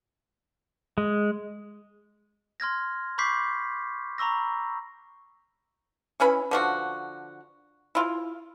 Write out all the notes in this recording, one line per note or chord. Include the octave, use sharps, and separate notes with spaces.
G#3
C6 F6 G#6 A#6
B5 C#6 D6 G6 B6 C7
A#5 B5 C#6 E6 A#6
E3 C#4 B4 B5
D3 F3 F#4
E4 F4